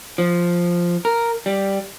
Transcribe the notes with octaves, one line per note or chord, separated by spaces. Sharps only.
F3
A#4
G3